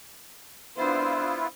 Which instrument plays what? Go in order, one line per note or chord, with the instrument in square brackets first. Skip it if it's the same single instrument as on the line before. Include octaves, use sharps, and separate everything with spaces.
[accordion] B3 E4 F4 [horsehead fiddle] D4 C5